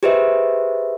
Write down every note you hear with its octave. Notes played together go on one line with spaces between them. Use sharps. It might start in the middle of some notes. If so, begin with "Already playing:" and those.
G4 G#4 B4 C5 D#5 E5